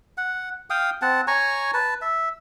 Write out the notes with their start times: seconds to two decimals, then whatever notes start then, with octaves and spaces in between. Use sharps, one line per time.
0.18 F#5
0.70 F5 G5 D#6
1.02 C4 F#5 A5
1.27 C#5 G#5 A#5 C#6
1.74 B4 A5
2.02 E5